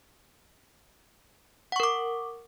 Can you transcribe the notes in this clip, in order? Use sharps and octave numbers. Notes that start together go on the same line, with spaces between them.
A#4 F#5 C#6 D6